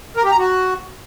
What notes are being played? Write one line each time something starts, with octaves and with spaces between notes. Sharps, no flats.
A#4
G4
A#5
F#4